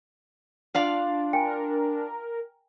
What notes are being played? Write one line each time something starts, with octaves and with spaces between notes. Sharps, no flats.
D4 F4 D5 F5
A#4 G5 G#5